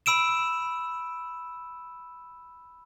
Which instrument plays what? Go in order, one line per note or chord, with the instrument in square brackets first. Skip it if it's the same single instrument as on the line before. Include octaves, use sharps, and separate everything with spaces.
[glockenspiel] B5 E6 D7 E7